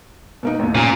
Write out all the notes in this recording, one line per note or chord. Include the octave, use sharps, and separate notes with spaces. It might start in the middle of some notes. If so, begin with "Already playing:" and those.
B2 A#3 D#4
A1 D#2
A#2 C#4 F4 A#5